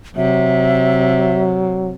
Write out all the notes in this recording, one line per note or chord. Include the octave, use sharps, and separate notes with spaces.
C3 F#3 E5